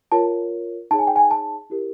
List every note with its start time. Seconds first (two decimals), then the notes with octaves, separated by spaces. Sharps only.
0.12 F4 A#4 C#5 A5
0.91 D#4 G#4 C#5 A5
0.99 G#5
1.07 G5
1.16 G#5
1.31 A5
1.70 E4 G4 A#4